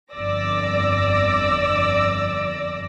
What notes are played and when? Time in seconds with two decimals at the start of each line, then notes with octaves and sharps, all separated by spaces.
0.13 G1 F2 D5 D6 E6 A#6